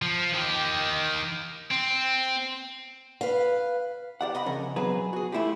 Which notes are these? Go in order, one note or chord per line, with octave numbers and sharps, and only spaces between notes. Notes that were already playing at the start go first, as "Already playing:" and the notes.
F3
D#3 G4
C4
B4 F5
G4 D5 F#5
D#5 F#5 B5
F2 C#3 A#4 C#5
B2 F#3 G#4 B4
F#4 G#4
A3 E4 F4 G4